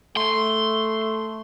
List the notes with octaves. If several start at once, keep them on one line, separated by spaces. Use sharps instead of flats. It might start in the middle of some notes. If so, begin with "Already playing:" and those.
A3 C6